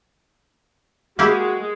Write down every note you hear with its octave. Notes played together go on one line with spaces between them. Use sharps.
G#3 A#3 E4 F#4 G4